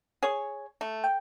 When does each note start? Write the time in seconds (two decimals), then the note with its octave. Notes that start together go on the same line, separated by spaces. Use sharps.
0.23 G#4 C#5
0.81 A3
1.04 G5